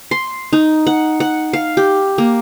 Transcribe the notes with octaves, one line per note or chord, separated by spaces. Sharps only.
C6
D#4
F#5
F#5
F5
G4
A#3